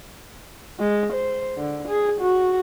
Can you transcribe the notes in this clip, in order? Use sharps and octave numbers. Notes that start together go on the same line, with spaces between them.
G#3
C5
D3
G#4
F#4